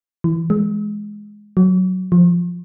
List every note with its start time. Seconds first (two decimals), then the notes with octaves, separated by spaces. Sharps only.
0.24 E3
0.50 G#3
1.57 F#3
2.12 F3